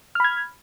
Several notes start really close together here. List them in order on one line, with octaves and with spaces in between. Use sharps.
F6 B5 G#6